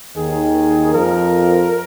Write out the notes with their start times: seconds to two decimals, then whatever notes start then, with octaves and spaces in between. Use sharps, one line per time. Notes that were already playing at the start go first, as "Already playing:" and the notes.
0.16 D#2 D#3 G#4
0.94 F2 F3 A#4